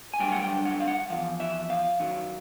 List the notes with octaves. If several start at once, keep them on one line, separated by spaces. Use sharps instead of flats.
G#5
G2 D3 F#3 G5
F#5
G5
F#5
F5
F#5
E2 C3 F3 F5
E5
F5
F#2 D#3 F#3